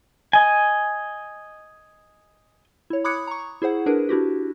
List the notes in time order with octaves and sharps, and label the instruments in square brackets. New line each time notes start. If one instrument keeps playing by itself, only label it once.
[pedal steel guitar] D#5 G#5
[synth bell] E4 C#5
B5 D6 D#6 F#6 G#6 C#7
A#5 C#6
E4 G#4 C5 F#5
D4 G#4 A#4 B4
D4 E4 F#4 G4